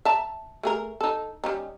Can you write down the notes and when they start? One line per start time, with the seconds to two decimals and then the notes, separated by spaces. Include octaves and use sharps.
0.05 E5 A5 A#5
0.63 A3 G#4 A#4
1.01 D#4 A4
1.44 G3 C#4 D#4